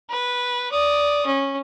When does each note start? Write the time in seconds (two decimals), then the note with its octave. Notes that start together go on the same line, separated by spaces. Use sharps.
0.10 B4
0.72 D5 D#6
1.27 C#4